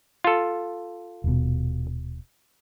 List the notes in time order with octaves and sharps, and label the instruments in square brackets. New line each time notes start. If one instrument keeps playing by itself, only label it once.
[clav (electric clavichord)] F4 A4
[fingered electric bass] D#1 B2